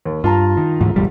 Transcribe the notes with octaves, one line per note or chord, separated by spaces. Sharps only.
D#2
G2 F4 A5 A#5
D#3
D2 G#2 E3
E1 A1 G3